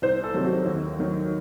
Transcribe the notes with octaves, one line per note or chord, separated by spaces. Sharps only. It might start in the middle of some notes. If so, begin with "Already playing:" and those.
C2 C5
A4
C3 D#3 F#3
F#4
D#2
D#3 F#3